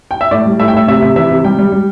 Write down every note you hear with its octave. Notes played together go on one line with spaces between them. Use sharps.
G5
E5
A2 D5
G3
A2 E5
G5
A2 E5
C3 E5
C3
E3 E5
C3
G3 G5
G3
G3